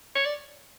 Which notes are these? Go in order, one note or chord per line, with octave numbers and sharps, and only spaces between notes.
C#5
D5